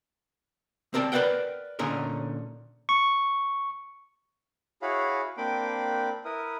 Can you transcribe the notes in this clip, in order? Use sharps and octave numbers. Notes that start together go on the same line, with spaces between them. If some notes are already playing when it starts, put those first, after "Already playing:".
C4 A#4 D5 A5
A#4 B4 D5 D#5 F#5 G5
A#2 D3 C#4 D#4 A#4
C#6
E4 F#4 G#4 C#5 F5 B5
A#3 C4 D4 G5 B5 D6
E4 A#4 B4 D#6